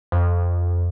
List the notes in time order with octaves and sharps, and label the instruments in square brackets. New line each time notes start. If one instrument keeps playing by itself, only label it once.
[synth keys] F2